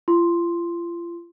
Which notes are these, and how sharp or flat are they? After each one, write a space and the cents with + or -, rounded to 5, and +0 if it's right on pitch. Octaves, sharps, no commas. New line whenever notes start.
F4 -35 C6 +0